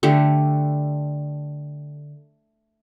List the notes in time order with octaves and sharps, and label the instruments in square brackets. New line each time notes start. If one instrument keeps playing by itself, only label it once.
[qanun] D3 A3 G4